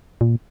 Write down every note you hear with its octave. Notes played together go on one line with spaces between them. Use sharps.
A#2